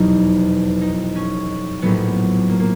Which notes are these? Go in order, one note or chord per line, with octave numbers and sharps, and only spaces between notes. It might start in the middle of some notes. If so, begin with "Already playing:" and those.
Already playing: F1 E2 B2 F#3 D#4
D#4
C#4
A#1 A2 F#3 B3
A#3
A#3